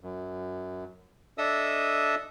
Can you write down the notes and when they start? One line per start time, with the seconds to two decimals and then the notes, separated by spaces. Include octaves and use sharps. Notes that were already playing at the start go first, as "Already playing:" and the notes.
0.01 F#2
1.38 D4 A4 D#5 E5 D#6 E6